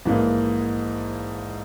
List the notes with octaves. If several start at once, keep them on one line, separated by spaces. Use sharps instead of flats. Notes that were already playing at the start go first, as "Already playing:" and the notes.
A#1 G#2 E3 A#3